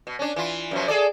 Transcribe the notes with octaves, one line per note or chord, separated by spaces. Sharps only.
B2
C#4 D4
E3 F4
F#2 B2 F3
G#4 A4 D5